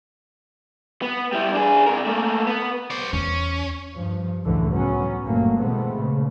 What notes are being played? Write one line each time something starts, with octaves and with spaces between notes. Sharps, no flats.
B3
G3 E4
D4 G#4
C3 A#4
A3 A#3
B3
C5 D5
E2 C#4
G2 F3
C#2 F#2 A2 D3 E3 A3
F#3 B3 C#4
G1 A#2 F#3 A3 A#3
B2 E3 G#3 A3 B3 C4
A#2 C#3